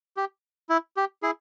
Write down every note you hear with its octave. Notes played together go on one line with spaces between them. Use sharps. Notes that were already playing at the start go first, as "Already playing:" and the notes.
G4
E4
G4
E4 G#4